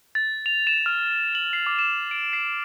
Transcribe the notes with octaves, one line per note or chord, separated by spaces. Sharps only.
A6
F7
E7
F6
F#7
C7
D6
E7
D7
C7